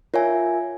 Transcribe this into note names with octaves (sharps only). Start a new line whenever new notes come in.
F4 A#4 C#5 E5 G#5